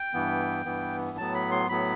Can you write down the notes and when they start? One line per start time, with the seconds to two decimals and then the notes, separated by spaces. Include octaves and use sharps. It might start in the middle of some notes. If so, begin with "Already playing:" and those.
Already playing: G5
0.14 G2 E3 B3
0.65 G2 E3 B3
1.17 A2 F#3 B3 A5
1.35 B5
1.51 C6
1.69 A2 F#3 B3 B5